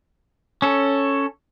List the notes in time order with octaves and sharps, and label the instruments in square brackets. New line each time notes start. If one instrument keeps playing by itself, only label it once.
[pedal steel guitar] C#4 A4